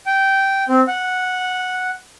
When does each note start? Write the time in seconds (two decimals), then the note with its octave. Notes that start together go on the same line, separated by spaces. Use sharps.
0.06 G5
0.69 C4
0.87 F#5